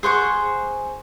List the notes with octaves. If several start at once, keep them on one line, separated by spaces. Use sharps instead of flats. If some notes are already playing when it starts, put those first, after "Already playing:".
G#4 C5 F#5 C#6